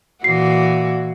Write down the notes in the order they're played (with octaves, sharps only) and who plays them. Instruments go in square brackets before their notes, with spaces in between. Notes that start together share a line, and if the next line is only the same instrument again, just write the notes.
[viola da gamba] A#2 E3 F#4 [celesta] C7